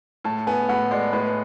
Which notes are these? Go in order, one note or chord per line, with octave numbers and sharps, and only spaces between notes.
A2 A5
B3 G#5
A2 F#5
G#3 D5
A2 B4